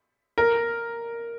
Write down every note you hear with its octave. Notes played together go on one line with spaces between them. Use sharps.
A#4